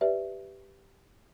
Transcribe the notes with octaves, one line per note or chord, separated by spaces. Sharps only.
G4 B4 D5 E5